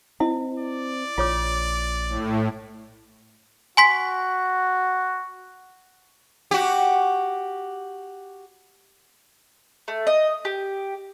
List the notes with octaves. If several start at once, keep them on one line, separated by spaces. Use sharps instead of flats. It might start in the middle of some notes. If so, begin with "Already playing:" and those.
C4 E4 D#5
D5
A#1 F4 C#5 D6
A2
F#4 G#5 C6 B6
F#4 G4
A3
D#5
G4